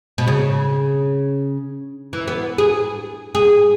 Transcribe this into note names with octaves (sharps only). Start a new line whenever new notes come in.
B2
C#3
E3
B3
G#4
G#4